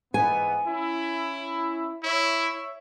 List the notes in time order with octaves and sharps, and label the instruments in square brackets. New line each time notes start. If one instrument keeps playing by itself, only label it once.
[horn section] G#2 E3 B3 [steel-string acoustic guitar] G#5
[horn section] C#4 E4
[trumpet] E4 [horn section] C#5 E5